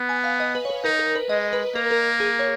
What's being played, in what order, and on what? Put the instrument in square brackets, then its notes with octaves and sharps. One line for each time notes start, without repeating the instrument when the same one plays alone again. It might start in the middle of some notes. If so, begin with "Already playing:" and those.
Already playing: [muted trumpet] B3
[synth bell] G#5
F5
D#5
B4
C#5
B4
[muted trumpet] D#4 [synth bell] A#4
[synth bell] A#4
B4
[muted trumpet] G#3 [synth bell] D#5
[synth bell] B4
[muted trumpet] A#3 [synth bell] A#4
[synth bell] A#4
G#4
C#5